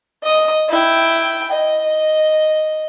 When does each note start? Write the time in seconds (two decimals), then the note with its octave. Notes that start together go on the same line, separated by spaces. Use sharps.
0.23 D#5 D#6
0.69 E4 G5
1.51 D#5